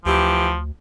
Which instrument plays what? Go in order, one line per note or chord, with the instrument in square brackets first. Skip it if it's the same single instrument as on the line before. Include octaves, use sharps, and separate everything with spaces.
[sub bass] D2 [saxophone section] E3 G4 [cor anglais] F3